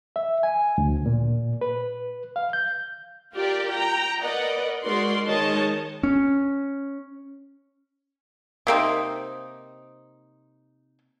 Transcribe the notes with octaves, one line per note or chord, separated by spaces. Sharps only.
E5
G#5
D2
A#2
B4
F5
G6
F4 G4 A#4 D5
G5 A#5
A#4 B4 D5 D#5 F#5
G#3 D#4 F#4 A#4 D5 C6
D#3 G#3 C#5 D#5 A5
C#4
C3 A#3 C4 D#4